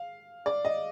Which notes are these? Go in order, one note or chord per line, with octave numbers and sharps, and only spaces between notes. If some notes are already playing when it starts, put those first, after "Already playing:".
Already playing: F5
D5
D#5